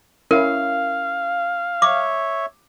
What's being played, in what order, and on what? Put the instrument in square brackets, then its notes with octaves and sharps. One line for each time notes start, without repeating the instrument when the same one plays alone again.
[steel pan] C#4 E4 [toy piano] A#4 [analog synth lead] F5
[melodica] C#5 E5 [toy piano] D6